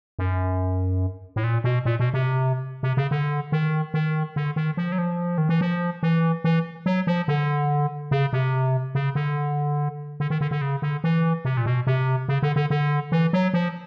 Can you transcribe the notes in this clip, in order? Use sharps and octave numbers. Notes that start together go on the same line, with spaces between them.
F#2
A2
A#2
B2
A#2
B2
C3
C3
C#3
D3
D#3
D#3
D3
D#3
F3
F#3
F3
D#3
E3
F3
E3
E3
F#3
F3
D3
C#3
C3
C#3
D3
D3
D#3
D3
D3
C#3
D3
E3
C3
A#2
B2
C3
C#3
D3
D3
D3
E3
F#3
F3